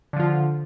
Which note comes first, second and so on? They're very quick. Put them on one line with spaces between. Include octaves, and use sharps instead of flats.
D3 F3 F4